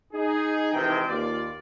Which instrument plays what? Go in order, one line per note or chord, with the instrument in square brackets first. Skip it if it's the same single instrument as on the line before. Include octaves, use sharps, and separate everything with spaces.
[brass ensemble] D#4 G#4
C3 D#3 E3 G#3 G#4 G5
D#2 F4 D5